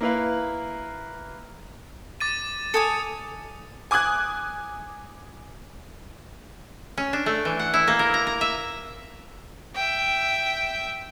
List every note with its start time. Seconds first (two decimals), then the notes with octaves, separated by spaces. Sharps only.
0.01 A#3 E4 B4 F5
2.20 D6 A6 D#7
2.74 A4 G#5 D6 D#6 C#7
3.91 G#5 D6 D#6 F#6 G#6
6.98 C#4
7.13 D4
7.26 A3
7.45 E3
7.59 F#5
7.74 E4
7.88 A#3
7.99 A#4
8.14 A#5
8.27 A#5
8.41 E5
9.75 E5 G5